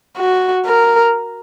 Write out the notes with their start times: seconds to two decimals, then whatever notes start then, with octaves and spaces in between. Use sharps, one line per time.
0.17 F#4
0.66 A#4